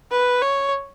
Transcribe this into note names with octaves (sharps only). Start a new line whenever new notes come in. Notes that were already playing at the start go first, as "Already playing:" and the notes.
B4
C#5